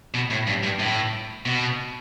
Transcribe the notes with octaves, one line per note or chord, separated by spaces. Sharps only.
B2
A2
G2
G2
A2
B2